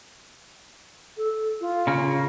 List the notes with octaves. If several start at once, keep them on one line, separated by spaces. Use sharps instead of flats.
A4
F4
C#3 A#3